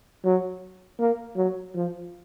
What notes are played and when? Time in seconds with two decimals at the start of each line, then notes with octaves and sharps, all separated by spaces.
0.25 F#3
0.99 A#3
1.36 F#3
1.75 F3